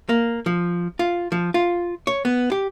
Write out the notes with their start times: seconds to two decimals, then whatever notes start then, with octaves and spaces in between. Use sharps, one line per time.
0.09 A#3
0.46 F3
0.99 F4
1.32 F3
1.54 F4
2.07 C#5
2.25 B3
2.52 G4